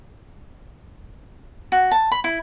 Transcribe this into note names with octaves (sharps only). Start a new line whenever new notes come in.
F#4
A5
B5
E4